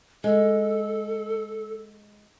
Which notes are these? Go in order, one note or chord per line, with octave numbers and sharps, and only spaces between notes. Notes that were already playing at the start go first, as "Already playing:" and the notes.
G#3 A4